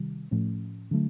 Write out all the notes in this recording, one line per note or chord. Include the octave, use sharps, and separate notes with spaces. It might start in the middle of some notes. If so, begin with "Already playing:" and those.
Already playing: C3 D#3 G3
A2 F3 A3 C#4
D3 F#3 A3